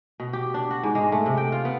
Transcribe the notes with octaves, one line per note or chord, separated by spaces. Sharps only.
B2
G4
D4
F#4
G#2
G#3
A3
C3
G5
F4
B3